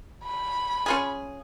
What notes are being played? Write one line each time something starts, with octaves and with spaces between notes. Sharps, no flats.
B5
C#4 F4 G#4